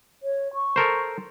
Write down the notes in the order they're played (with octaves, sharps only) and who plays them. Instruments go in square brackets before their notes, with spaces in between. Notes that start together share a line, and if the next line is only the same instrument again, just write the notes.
[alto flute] C#5
C#6
[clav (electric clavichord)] A4 A#4 C5